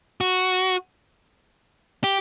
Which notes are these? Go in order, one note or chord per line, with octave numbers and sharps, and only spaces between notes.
F#4
G4